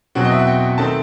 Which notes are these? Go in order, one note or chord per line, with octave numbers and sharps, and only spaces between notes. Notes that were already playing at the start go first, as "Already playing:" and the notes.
E2 B2 F#3 C4 F#5
D#5
E5
F#5
G5
D#3 A3 C4 D#4 A5